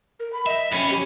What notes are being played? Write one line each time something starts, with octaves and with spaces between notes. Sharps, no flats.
A#4
B5
D#5 E5
F2 C#4 B5
G4